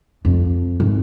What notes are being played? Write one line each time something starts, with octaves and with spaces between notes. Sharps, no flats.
F2
G#1